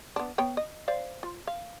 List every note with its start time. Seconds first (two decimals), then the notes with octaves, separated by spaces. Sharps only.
0.16 B3 D4
0.38 B3 C#5 G5
0.57 D#5
0.88 C5 D5 F5
1.23 F4
1.47 F5